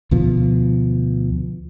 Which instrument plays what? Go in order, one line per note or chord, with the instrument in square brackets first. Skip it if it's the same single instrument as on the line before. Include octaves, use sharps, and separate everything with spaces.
[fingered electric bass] D2 B2 F3